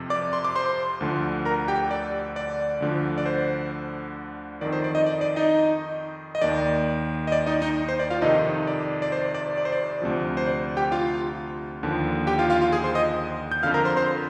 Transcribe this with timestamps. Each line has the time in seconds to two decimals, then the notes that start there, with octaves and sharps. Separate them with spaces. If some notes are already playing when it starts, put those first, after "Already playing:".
Already playing: F2 C3 F3
0.10 D5 D6
0.33 C6
0.45 D6
0.56 C5 C6
1.01 D2 D3 F3
1.45 A#4 A#5
1.68 G4 G5
1.91 D5
2.36 D5
2.81 D2 D3 F3
3.18 D5
3.26 C5
4.61 F2 D#3 D5
4.72 C5
4.84 D5
4.95 D#4 D#5
5.06 D5
5.21 D5
5.36 D#4 D#5
6.35 D#5
6.41 D#2 D#3 D5
7.27 D#5
7.32 D5
7.46 D#4 D#5
7.62 D#4 D#5
7.88 C5
7.99 D5
8.10 F4 F5
8.22 F2 C3 D#3 D#4 D#5
8.67 D5
9.02 D5
9.12 C5
9.35 D5
9.58 D5
9.65 C5
9.72 D5
10.02 D2 C3 F3
10.37 C5
10.47 D5
10.77 G4 G5
10.92 F4 F5
11.83 D#2 D3 F3
12.27 G4 G5
12.39 F4 F5
12.50 F4 F5
12.61 F4 F5
12.72 G#4 G#5
12.84 C5 C6
12.95 D#5 D#6
13.51 G6
13.63 F2 D3 F3 F5 F6
13.74 A#4 A#5
13.85 C5 C6
13.97 C5 C6